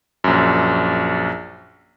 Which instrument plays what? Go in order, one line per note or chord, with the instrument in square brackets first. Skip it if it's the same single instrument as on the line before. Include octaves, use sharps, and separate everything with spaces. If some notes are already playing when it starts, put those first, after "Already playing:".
[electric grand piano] A#1 F#2